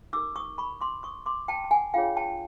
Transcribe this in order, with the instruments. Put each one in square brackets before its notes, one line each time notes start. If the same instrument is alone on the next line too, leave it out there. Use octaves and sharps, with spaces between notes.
[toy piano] D#4 G4 A#4 D6 E6
C#6 D#6
B5 C#6
C6 D6
C#6 D#6
C6 D6
G5 A5
A5
F#5 G#5
D4 F4 G#4 C#5 F5 G5
G5 A5